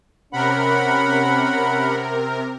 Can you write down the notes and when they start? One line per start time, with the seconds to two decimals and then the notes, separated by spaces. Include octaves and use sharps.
0.33 C3 C#4 A#4 F#5 B5